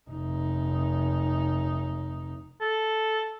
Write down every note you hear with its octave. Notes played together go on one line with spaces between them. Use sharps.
F1 D#4
A4